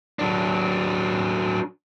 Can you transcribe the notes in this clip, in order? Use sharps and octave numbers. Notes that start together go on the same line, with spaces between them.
F#3 D4